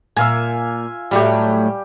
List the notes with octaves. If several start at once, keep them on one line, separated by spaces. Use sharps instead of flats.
A#2 E5 F5 G#5
A2 F#3 G3 A3 G4